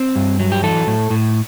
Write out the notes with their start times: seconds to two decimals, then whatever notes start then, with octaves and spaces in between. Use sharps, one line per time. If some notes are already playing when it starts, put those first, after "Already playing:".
Already playing: C4
0.16 G2
0.40 F#3
0.52 G4
0.63 E3 A4
0.87 A2
1.10 A2